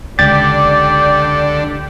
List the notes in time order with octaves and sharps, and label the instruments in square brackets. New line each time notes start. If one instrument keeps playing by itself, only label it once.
[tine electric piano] C#2 A6 [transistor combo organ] D3 [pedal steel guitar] G4 [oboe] D5